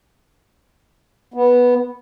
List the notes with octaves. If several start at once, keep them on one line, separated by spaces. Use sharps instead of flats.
B3